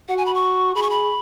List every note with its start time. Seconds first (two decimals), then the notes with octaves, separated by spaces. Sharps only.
0.09 F#4 F#5
0.17 G#5
0.26 B5
0.35 C#6
0.75 G#4 B5
0.83 C#6
0.90 B5